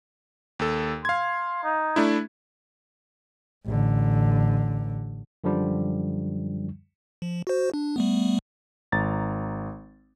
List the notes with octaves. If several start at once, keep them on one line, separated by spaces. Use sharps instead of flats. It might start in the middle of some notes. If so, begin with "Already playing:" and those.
D#2 A4
F5 C6 G#6
D#4
A3 D4 E4
A1 D3
F#2 D3 F3 G3
F3
F#4 C5
D4
G3 A3 B3
G#1 A#5 A6